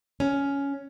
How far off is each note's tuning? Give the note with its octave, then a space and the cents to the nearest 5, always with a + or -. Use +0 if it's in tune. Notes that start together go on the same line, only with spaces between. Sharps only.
C#4 +10